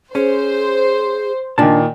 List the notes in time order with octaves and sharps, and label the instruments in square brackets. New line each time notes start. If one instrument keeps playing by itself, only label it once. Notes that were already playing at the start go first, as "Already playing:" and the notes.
[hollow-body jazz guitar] C#4 [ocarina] G#4 [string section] C5
[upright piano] A#2 D#3 [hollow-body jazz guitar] D4 A5